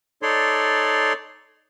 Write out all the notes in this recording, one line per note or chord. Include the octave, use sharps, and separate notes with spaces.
D#4 A4 C#5 D5 C6